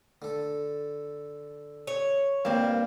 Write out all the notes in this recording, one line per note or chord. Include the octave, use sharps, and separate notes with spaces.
D3 A4
C#5
G2 A#2 G3 A#3 C4